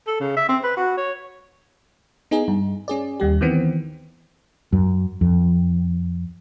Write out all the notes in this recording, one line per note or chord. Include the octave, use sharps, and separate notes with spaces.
A4
C#3
E5
C4
B4
F#4
C#5
B3 D#4 G#4
G2
C#4 G#4 D5
D#2 G3 G4
D#3 E3 B3 C4
F#2
F2